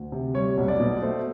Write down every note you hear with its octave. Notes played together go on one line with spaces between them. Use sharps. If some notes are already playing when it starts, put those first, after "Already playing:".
Already playing: D2
C3
G3 C#5
B1
D5
B2
A3 C5